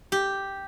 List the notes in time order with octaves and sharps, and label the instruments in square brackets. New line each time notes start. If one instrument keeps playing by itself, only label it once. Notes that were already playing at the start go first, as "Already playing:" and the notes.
[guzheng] G4